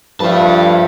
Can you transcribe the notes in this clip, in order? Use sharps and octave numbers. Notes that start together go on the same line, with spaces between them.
G2 F3 B4 E5 F5 A5